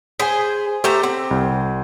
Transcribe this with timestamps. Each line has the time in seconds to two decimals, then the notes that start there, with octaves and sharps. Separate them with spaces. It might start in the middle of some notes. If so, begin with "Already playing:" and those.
0.20 G#4 C5 G#5 B6
0.84 A3 G4 C5 A#5
1.03 C4
1.31 C2